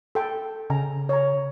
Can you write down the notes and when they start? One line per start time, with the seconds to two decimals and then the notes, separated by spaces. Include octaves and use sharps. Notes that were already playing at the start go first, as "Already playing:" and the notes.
0.15 A4 G5 A5
0.70 C#3 G#5 A#5
1.09 C#5 A#5